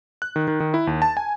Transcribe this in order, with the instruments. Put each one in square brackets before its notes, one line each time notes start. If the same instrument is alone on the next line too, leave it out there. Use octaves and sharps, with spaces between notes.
[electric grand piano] F#6
D#3
D#3
D#3
E4
D#2
A5
G#5